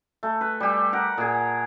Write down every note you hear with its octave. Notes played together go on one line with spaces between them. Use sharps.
A3
B4
G3 G4
A#4 F#5
A#2 G#4